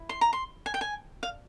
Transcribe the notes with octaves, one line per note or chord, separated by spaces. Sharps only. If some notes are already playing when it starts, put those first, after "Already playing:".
Already playing: E4
C6
A#5
C6
G#5
G5
G#5
F5